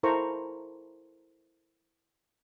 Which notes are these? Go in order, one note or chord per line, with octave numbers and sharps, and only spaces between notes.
E4 A4 A#4 C5 A#5 C#6